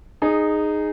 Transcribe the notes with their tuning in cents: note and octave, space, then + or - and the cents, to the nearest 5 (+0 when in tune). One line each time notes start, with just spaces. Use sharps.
D#4 -15 G#4 +0